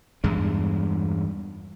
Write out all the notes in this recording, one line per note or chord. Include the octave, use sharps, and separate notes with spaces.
E2 G2 G#3